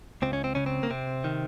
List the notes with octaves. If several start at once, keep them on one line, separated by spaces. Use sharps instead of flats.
C#2 C4
C#4
C4
C#3 C#4
C4
A#3
C3 C4
D#3